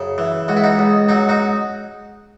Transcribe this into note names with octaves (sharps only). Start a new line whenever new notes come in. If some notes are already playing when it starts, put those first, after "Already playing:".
Already playing: F#2 C#3
E3
C#2 F#4
E4
D#4 F#4
C#2
F#3 D#4 F#4
D#4 F#4